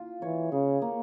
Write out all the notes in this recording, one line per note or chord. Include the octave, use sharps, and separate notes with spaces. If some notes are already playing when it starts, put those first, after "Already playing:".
Already playing: F4
E3 C#5
C#3 G#4
A#3